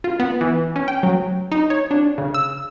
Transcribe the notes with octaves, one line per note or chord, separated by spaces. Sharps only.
F4
B3
E3
C#4
G5
F#3
D#4
C#5
D4
C#3
E6